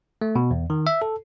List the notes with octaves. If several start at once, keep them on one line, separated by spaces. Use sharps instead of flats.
A3
B2
E2
D#3
E5
A4